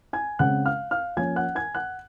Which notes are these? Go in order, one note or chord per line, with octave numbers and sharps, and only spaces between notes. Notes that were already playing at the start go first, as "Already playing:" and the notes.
G#5 G#6
C#3 G#3 C4 F#5 F#6
F5 F6
F5 F6
F3 A#3 C#4 G#5 G#6
F#5 F#6
G#5 G#6
F#5 F#6